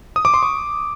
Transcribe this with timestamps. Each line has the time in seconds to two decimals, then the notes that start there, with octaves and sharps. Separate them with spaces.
0.16 D#6
0.25 D6
0.34 C6
0.43 C#6